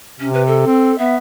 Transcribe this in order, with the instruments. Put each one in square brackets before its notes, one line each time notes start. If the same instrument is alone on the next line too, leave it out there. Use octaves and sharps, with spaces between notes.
[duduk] C3 [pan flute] C#4
[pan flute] B4
A4
[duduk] C4
[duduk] B3 [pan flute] E5